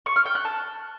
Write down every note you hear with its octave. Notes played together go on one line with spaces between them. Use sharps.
C#6
F6
G5
F#6
A5